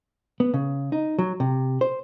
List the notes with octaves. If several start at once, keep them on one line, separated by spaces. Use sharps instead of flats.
B3
C#3
D#4
F#3
C3
C5